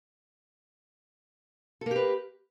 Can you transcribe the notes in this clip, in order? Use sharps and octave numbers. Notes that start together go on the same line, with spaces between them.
A#3 G4 A4 B4